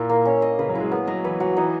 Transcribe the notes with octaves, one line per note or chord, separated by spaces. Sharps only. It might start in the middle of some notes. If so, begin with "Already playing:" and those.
Already playing: A#2 E4 A#4
A#3
C#4
D#5
C#3 B4
F#3
E4
G#3
A#3 B3
F#3 D#5
E3 B4
F#3 F#4
E3 D#4